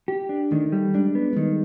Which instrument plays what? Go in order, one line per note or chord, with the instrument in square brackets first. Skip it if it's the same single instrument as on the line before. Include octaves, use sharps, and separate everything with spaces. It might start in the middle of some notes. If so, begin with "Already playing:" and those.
[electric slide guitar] G4
D4
[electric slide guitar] D#3 [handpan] A3
[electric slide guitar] G3
[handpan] G#3 [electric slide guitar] D4
[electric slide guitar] B3
[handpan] G#3
[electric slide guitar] D#3 [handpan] G3